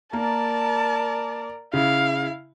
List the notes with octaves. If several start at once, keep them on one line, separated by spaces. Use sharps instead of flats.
A#3 A#4 D5 A5
C#3 E4 F5